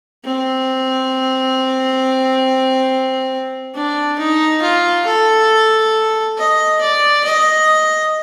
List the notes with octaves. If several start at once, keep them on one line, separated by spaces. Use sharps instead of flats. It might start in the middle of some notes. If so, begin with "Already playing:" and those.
C4
D4
D#4
F4
A4
D#5
D5
D#5